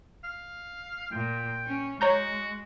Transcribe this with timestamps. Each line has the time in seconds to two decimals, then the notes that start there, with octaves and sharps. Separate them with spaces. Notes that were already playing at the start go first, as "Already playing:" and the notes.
0.24 F5
1.12 A#2 G5
1.66 C#4
2.01 G#3 F#4 C#5 A#5 G6